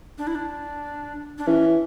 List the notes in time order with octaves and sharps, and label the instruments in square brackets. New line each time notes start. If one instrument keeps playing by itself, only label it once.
[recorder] D4
E4
D4
D4
[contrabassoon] E3 [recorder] C#4